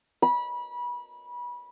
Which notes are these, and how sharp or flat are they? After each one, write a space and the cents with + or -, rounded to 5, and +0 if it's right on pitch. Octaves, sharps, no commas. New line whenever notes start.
B5 -25